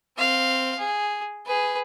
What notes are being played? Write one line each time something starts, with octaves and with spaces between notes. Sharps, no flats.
C4 F5
G#4
G#4 B4